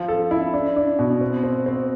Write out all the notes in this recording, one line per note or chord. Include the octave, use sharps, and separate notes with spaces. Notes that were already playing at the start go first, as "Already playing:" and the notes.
Already playing: F3
A4
E4
D4
D4
B2
C4
C4
C4